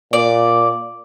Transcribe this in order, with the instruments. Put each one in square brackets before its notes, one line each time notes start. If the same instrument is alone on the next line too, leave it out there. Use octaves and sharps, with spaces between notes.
[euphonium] A#2 [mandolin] D5